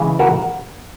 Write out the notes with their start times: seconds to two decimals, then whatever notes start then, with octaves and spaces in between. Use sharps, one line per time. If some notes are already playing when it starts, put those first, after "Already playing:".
Already playing: C#3 E3 G#3
0.19 F#4 A#4